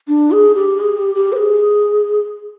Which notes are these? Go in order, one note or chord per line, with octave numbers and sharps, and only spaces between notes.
D4
G#4
G4
G#4
G4
G4
C5
G#4